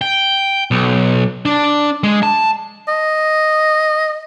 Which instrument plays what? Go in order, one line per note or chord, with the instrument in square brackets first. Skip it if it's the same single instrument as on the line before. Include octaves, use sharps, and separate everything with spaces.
[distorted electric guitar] G5
B1
D4
G#3
A5
[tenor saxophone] D#5